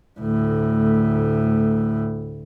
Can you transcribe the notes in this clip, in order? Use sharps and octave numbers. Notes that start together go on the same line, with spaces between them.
D2 A2